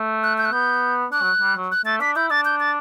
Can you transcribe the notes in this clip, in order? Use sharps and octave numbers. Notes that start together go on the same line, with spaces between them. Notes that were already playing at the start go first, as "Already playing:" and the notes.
Already playing: A3
F#6
G6
F#6
B3 G6
D4 F#6
F#3
G3
F#3
F#6
A3 A6
D4 B6
E4 G6
D4 A6
G6
A6